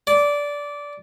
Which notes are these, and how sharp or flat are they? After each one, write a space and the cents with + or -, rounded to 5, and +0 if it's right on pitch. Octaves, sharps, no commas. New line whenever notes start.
D5 -15